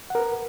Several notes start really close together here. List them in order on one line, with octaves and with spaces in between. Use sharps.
F#5 A#4 B4